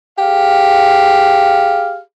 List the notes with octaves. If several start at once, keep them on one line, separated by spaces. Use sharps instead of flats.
G4 G#4 F5